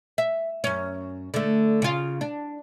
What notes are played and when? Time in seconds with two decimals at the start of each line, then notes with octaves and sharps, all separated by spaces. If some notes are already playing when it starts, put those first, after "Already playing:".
0.18 E5
0.64 F#2 C#4
1.34 D3 A3
1.82 C#3 F4
2.21 D4